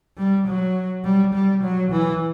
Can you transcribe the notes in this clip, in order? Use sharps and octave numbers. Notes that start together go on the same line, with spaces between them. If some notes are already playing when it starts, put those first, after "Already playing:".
G3
F#3
G3
G3
F#3
E3